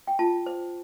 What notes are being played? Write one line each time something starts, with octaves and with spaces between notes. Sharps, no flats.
G5
F4 A5
C5